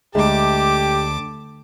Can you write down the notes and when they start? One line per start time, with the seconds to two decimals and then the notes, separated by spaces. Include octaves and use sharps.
0.15 D2 G#3 G4 A5 D6